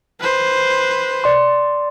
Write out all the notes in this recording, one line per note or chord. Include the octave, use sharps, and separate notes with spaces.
B4 C5
D5 C6